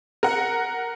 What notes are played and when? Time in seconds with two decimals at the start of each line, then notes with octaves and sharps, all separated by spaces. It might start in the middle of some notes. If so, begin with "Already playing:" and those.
0.23 A#4 F#5